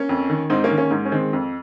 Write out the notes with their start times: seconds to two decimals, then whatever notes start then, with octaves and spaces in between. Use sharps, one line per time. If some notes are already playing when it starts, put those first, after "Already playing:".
Already playing: A#3 C#4
0.09 F2
0.30 D#3
0.50 G#2 C4 D#4
0.64 A#3 C#4
0.71 D#3
0.77 A#3 C#4
0.91 G#2 A#3
1.05 C#4
1.12 D#3 G#3 C4
1.33 F2